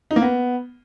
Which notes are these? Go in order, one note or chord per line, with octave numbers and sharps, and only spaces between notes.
D#4
A#3
B3